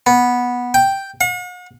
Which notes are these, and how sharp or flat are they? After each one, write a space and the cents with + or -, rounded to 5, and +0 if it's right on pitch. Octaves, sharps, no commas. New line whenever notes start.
B3 -10
G5 +0
F#5 -45